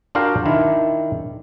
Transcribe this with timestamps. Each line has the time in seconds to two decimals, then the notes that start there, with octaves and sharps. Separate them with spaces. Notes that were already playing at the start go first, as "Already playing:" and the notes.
0.15 D4 F4 F#4 A#4 F5 G5
0.46 D#3 D4 E4